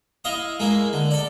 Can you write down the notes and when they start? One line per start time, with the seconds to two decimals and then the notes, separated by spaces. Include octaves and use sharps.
0.25 E4 D#5 F5 D#6
0.60 G#3 A#3 E4
0.93 D3
1.11 A4 D5